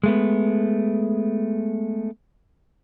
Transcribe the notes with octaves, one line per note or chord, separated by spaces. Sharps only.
G#3 A3 B3